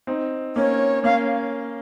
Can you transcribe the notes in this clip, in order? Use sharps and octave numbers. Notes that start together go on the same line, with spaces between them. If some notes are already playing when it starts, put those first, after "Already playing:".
C4 D#4
A#3 C#4 C#5
A#3 C#4 F5